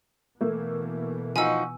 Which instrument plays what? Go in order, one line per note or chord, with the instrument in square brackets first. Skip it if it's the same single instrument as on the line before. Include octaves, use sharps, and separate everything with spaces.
[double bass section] B2 E3 [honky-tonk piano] A3 A#3
[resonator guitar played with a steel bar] F3 D#4 F#4 [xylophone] G#5 E6